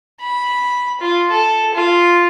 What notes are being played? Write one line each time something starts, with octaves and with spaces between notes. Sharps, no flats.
B5
F4
A4
F4